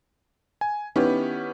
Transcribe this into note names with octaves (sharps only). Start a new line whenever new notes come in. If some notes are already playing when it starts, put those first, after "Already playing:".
G#5
D#3 B3 C#4 E4 G4